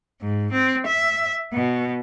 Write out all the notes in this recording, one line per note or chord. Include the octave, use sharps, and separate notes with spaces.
G#2
C4
E5
B2